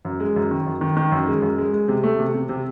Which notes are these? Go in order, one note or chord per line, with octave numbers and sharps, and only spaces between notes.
F#2
G#3
F#2
D#3
F#2
D#3
D#3
F#2
G#3
F#2
G#3
G#3
C3
A3
C3
C3
C3